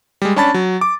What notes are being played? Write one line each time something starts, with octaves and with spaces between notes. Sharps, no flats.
G3 G#3
C#4 D4 A5 B5 A6
F#3
D6